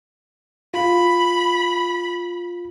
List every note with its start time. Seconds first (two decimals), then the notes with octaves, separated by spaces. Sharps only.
0.74 F4 B5